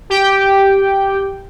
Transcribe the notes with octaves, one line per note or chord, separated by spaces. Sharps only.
G4 G5